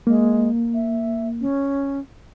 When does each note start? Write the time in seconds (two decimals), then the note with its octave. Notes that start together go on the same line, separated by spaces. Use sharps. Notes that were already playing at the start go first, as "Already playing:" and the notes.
0.07 G#3 A#3
0.74 E5
1.41 C#4